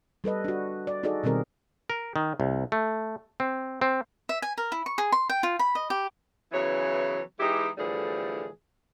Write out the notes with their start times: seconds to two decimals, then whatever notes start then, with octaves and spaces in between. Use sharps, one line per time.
0.24 G3 A4 B4 D#5
0.45 D4 F#4
0.87 D5
1.03 D#4 F#4 G#4 A4 D5 D#5
1.23 B2 D#3 G3 C4 G#4 A#4
1.90 A#4
2.16 D#3
2.40 C2
2.72 A3
3.40 C4
3.81 C4
4.29 E5
4.42 G#5
4.58 A#4
4.72 E4
4.86 C#6
4.98 G#4
5.12 C6
5.30 G5
5.43 F4
5.59 B5
5.75 D#5
5.90 G4
6.52 C#3 E3 F#3 B3 E4 C#5
7.39 E3 G#3 D#4 E4 G4
7.78 A2 D3 E3 F3 G3 G#4